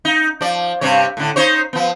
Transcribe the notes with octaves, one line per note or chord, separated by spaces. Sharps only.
D#4
F3 D5
G2 C3 C#5
A2 D3
D#4 C5 C#5
F3 B3